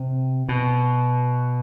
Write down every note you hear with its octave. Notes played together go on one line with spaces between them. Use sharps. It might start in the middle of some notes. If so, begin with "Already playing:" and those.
Already playing: C3
B2